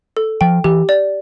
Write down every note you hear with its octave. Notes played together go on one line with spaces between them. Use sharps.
A4
F3 G5
E3 G4
D5